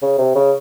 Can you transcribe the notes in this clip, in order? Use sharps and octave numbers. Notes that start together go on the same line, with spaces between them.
C#3
C3
C#3